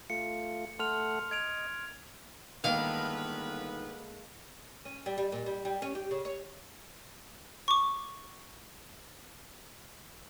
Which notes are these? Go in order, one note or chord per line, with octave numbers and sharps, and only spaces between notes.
A3 F4 C#7
A3 A4 F#5 C6 F6 F7
D#5 G#6 D7 F7
G1 D#3 G#3 A#3 B3 A4 B4 F5
C#4
G3
G3
A#2
G3
G3
C#4
G4
C#3
C#5
C#6 D6